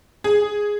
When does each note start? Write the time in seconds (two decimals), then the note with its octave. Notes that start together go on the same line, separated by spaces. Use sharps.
0.24 G#4